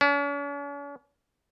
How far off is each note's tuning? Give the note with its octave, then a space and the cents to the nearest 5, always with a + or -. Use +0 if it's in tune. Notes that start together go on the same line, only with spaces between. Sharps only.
C#4 +45